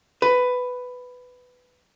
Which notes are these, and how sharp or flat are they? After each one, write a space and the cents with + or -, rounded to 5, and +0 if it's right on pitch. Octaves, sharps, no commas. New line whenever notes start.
B4 +10